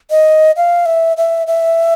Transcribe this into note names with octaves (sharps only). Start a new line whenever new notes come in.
D#5
F5
E5
E5
E5